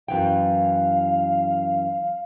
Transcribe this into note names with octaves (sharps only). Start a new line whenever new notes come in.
F#2 E3 F5 G5